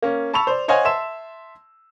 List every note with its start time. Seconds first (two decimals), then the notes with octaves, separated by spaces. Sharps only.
0.02 A#3 C#4
0.34 A5 B5 C#6 E6 F7
0.47 C5 D5
0.68 C5 C#5 D#5 F5 F#5 G#5
0.85 E5 A5 C6 E6 E7